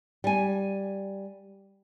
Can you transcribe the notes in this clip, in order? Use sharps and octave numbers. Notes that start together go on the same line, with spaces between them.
G3 G#5